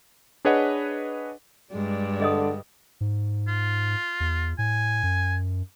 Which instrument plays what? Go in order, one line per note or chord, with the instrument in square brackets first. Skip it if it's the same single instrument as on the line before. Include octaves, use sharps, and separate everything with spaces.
[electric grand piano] D4 G#4 B4 C#5 D#5 F#5
[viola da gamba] G2 [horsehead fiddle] G#3 D5
[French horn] D3 [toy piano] G#4 D#5 D#6
[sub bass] G#2
[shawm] F4
[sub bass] E2
[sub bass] A2 [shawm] G#5
[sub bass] F#2